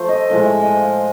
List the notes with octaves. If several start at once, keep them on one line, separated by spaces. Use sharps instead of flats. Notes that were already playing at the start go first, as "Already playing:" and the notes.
Already playing: F3 A3 C5
D#5
A2 F3 G#3 D#5
E5
D#5
F5